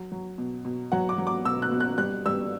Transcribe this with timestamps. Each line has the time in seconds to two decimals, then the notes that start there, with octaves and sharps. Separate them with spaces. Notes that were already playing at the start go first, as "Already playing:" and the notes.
Already playing: F#3
0.12 F#3
0.38 B2
0.65 B2
0.92 F#3 F#5
1.09 D6
1.18 F#3
1.27 D6
1.45 B2 E6
1.62 F#6
1.72 B2
1.80 F#6
1.98 G3 F#6
2.26 G3 E6